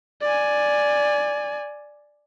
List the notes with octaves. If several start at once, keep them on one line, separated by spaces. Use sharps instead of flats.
D5 G#5